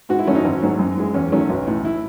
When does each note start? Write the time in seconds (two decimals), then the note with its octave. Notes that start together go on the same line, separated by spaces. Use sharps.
0.09 G#2 F#4
0.19 E4
0.27 D#3 F#3 A3 C#4
0.35 D#4
0.45 G#1 C#4
0.62 G#2 D#3 F#3 A3
0.79 F#2
0.97 E3 G#3
1.14 E2 C#4
1.32 D#3 F#3 A3 C#4
1.50 B1
1.67 A2 E3
1.85 E4